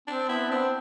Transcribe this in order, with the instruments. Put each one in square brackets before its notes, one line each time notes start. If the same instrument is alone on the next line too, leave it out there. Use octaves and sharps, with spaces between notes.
[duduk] C4 [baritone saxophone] D4
[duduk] B3 [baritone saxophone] E4
[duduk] C4 [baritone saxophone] D4